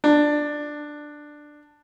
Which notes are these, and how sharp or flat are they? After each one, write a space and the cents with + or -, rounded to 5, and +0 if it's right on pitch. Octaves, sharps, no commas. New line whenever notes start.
D4 +10